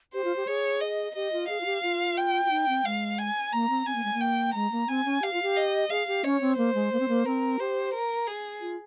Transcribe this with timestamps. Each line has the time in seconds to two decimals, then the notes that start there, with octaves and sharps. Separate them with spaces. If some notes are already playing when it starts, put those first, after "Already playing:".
0.14 G4 C5
0.24 F4
0.36 G4
0.47 G#4 C#5
0.81 D#5
1.15 G4 D#5
1.33 F4
1.49 G#4 F5
1.61 F4
1.65 G4
1.83 F4
2.17 G5
2.45 F4
2.50 D#4
2.68 C4
2.85 G#3 F5
3.18 G#5
3.53 A#3 A#5
3.69 C4
3.86 C4 G#5
3.95 A#3
4.04 G#3
4.14 A#3
4.21 G5
4.54 G#3 A#5
4.72 A#3
4.88 C4 G#5
5.05 C#4
5.22 G4 F5
5.33 F4
5.42 G4
5.56 D#5
5.90 G#4 F5
6.07 G4
6.24 C#4 C#5
6.41 C4
6.57 A#3 C5
6.74 G#3
6.92 A#3
7.00 C4
7.08 A#3
7.25 C4 A#4
7.59 G4 C5
7.94 A#4
8.27 G#4
8.61 F4